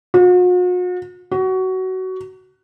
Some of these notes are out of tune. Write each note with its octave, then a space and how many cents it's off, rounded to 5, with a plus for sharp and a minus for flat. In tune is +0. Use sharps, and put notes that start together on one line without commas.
F#4 -45
F#4 +20